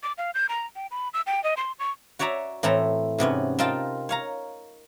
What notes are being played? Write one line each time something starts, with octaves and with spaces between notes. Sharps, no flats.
D6
F5
G6
A#5
G5
B5
E6
G5
D#5
C6
C#6
F#4 C#5 D5 E5 A#5
A2 E3 C4 A4 A#5
G#2 C3 B3 C#4
C4 D#4 F4 A#4 A5
C#5 F5 A#5